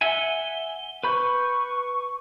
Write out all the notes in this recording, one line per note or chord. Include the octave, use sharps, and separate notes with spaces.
E5 F#5 G#5 G7
B4 B5 C#6 G6